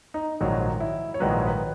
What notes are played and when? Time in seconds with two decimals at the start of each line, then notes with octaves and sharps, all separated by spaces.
0.14 D#4
0.41 A#1 G#2 D#3 F#3 D#4
0.80 E4
1.14 C#5
1.20 A#1 G#2 D#3 F#3 B4
1.47 B4